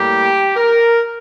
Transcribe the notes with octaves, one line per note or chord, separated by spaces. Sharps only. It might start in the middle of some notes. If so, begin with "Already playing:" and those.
Already playing: A2 G3 A#3 G4
A#4